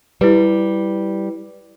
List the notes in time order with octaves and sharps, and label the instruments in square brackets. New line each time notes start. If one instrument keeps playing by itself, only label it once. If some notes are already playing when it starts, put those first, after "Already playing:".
[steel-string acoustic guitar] G3 [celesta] E4 B4